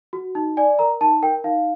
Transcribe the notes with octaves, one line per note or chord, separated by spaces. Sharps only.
F#4
D#4
D5 G#5
A#4 A#5
D#4 A5
A#4 G5
D#4 F5